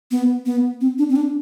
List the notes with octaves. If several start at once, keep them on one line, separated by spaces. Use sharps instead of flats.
B3
B3
C4
D4
C4
D4